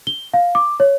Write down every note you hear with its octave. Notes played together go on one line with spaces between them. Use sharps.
G7
F5
D6
C#5